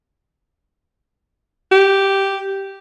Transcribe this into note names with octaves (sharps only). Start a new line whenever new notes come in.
G4